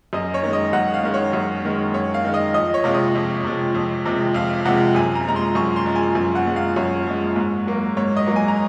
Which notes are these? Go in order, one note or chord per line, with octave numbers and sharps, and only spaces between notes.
F#2 D#5
C#5
D#3 G#3
D#5
F#2 F#5
F5
D#3 G#3
C#5
F#2
D#3 G#3
F#2 C#5
F5
D#3 G#3
D#5
F2 D#5
C#5
C3 F3 G#3 F5
D#5
F2
C3 F3 G#3
F2
C3 F3 G#3
F2 F5
C3 F3 G#3 F#5
F#2 G#5
A#5
F3 G#3 A#5
C6
F#2 C#6
C6
F3 G#3
G#5
F#2
F#5
F3 G#3
F5
F#2 C#5
F3 G#3
G#2
F#3 A#3
G#2 C#5
D#5
F#3 A#3
G#5
A#5